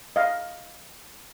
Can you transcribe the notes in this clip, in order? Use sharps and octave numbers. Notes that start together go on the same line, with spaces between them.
D#5 F5